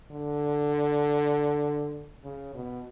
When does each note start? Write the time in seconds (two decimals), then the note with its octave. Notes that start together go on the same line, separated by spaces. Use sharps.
0.11 D3
2.24 C#3
2.54 B2